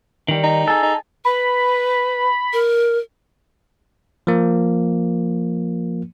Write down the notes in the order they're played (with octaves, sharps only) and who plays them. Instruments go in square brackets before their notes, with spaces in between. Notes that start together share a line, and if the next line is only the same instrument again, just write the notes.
[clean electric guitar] D#3 G3
[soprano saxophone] D#4
[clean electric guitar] G#4 A4
[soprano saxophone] D#4
[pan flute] B4 [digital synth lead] B5
[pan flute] A#4
[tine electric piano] F3 A#3